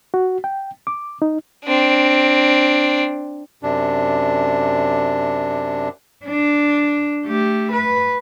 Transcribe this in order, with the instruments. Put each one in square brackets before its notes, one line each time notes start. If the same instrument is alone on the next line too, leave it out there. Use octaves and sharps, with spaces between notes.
[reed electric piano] F#4
G5
D6
D#4
[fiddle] C4 D4
[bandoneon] F#2 C3 D4
[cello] D4
A3 G4
B4